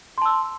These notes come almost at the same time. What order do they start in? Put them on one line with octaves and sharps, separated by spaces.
C6 A5 E6